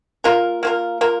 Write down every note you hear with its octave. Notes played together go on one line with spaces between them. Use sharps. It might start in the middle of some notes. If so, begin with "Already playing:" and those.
A#3 F4 A#4
A#3 F4 A#4
A#3 F4 A#4